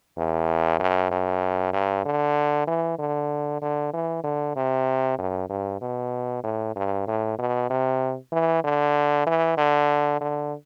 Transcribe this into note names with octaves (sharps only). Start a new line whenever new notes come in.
E2
F#2
F#2
G2
D3
E3
D3
D3
E3
D3
C3
F#2
G2
B2
A2
G2
A2
B2
C3
E3
D3
E3
D3
D3